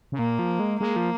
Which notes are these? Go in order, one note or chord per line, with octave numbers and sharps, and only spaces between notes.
C#3
A#2 A#3
F3
G#3
G#3 A#3
F3